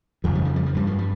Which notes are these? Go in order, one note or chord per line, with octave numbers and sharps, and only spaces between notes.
F2 C#3 F3
G3
F3
G3
F3
G2 G3
F3
G3